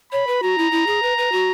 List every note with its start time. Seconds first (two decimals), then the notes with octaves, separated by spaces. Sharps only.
0.12 C#5 B5
0.27 B4
0.42 F#4 A#5
0.58 E4
0.71 E4
0.86 G#4
1.02 B4
1.17 B4
1.32 F#4